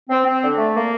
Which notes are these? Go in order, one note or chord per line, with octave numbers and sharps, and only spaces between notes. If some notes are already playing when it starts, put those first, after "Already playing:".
C4
C4
D3
A3
A#3